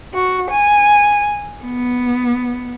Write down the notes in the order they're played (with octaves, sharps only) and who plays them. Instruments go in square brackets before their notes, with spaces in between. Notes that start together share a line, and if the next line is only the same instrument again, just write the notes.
[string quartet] F#4
G#5
B3